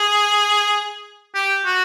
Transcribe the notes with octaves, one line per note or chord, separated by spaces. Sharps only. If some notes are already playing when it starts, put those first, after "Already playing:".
Already playing: G#4
G4
F#4